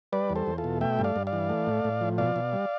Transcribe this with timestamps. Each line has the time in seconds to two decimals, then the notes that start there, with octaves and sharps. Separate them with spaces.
0.13 G3 B4 D5
0.30 E2
0.36 A4 C5
0.47 E2
0.58 F4 A4
0.64 B2
0.81 A3 E5 G5
0.99 G2
1.04 D5 F5
1.16 G2
1.27 D5 F5
1.33 E3
1.50 A3
1.67 A2
1.84 A2
2.01 F3
2.18 B2 D5 F5
2.36 B2
2.53 G3